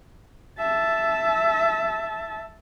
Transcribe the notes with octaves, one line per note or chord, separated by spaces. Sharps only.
E5 A5